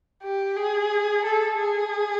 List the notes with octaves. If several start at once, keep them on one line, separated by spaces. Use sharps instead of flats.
G4
G#4
A4
G#4